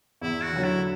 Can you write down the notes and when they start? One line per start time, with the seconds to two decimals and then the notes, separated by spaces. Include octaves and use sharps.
0.21 E2 E4
0.43 F#4
0.53 D3 F#3
0.64 E4